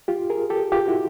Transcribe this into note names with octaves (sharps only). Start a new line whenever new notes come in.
F4 G4
G#4 A#4
G4 A4
F4 G4
E4 F#4